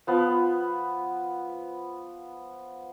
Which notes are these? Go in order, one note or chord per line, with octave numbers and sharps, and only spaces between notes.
F3 B3